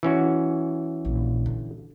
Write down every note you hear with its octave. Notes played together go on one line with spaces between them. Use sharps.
E3 C#4 F#4
A#1
D3